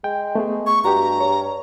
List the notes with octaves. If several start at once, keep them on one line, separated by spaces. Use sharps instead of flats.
G#3 G5
A3 B3 G#4
C#6
G2 F#4 G4 A#5
C#5